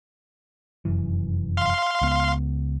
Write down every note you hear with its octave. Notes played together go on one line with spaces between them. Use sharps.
F1 F#2 E3
F5 C6
C#2 B3